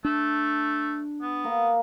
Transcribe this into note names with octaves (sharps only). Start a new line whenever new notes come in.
A3 D4
B3
A#3 A#4